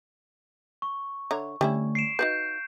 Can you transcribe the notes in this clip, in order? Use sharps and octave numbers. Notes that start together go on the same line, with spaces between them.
C#6
D3 C#5 E5 A#5
D3 G3 A3 C#4 E4
C7 D7 E7
D#4 F#4 B4 F5 G6 C7